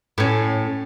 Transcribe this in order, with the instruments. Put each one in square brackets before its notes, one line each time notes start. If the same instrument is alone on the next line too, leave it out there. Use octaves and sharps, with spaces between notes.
[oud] A2 C#4